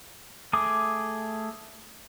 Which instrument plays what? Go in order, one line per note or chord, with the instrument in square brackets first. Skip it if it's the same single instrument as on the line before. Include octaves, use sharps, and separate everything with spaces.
[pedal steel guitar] A3 G#4 D6 D#6